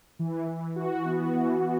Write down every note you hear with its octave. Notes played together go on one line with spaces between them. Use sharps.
E3
E3
F#4
B3
E3
E3